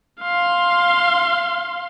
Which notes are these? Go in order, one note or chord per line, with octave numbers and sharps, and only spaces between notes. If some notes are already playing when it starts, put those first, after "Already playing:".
F5 C6